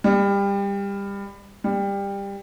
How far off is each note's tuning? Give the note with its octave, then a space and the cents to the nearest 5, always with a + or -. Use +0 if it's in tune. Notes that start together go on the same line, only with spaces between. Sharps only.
G3 +25
G3 +20